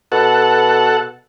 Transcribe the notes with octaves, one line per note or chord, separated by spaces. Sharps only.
B2 A4 F#5